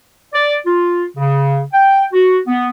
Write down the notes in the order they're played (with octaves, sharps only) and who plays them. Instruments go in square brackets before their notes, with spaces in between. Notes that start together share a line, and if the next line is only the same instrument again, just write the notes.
[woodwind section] D5
F4
C#3
G5
F#4
B3